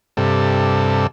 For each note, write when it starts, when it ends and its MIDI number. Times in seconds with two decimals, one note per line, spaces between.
0.17 1.07 43
0.17 1.07 48
0.17 1.07 69